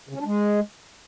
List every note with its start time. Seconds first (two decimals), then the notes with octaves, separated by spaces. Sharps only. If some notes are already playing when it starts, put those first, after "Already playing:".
0.09 C#3
0.15 C#4
0.20 D4
0.25 G#3